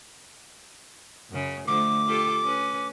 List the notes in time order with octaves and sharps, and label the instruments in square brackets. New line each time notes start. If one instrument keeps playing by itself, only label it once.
[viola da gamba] F#2 C#3
[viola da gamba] D3 F3 A3 [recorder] D6
[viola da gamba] F4 G4 A4
C#4 B4